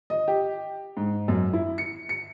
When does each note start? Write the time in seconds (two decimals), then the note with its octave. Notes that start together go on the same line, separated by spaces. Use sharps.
0.10 D#5
0.28 G4
0.97 G#2
1.28 F#2
1.53 E4
1.78 C#7
2.09 C#7